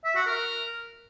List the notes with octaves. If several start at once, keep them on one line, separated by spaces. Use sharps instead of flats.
E5
F#4
A#4